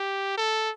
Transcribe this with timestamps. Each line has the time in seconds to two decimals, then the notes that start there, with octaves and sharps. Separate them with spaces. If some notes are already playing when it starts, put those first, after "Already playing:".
Already playing: G4
0.37 A4